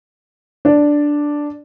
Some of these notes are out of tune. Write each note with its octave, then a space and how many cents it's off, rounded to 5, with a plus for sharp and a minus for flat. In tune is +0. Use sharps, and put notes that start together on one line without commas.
D4 +0 D5 +0